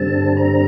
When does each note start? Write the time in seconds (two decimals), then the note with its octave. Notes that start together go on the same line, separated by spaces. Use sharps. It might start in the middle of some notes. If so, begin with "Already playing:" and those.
Already playing: G2 D3 G3 C4 A5
0.37 A#5